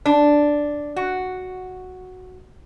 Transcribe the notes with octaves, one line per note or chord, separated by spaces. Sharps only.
D4
F#4